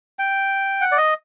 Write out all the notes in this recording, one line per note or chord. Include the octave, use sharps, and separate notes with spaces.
G5
F#5
D5
D#5